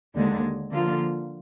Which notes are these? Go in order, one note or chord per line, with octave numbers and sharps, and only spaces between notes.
D#2 D3 G#3
D3 F3 A#3 F4